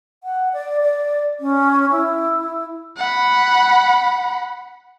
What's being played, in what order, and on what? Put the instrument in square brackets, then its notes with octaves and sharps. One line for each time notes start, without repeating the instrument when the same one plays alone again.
[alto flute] F#5
D5
D5
C#4
E4
[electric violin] F#5 B5